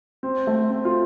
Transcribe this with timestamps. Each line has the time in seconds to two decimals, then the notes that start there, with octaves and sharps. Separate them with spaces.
0.23 C4
0.47 A3
0.71 C4
0.85 F4